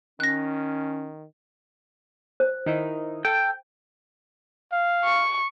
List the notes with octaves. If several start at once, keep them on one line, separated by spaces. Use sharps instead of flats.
D#3 C#4 F#6 A#6
C5
D#3 D#4 E4
A4 G5
F5
C#6